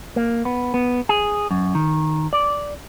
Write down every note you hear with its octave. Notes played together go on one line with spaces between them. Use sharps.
A#3
B3
B3
G#4
F#2
D#3
D5